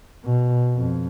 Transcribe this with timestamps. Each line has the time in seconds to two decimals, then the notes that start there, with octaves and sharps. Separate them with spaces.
0.25 B2
0.76 F2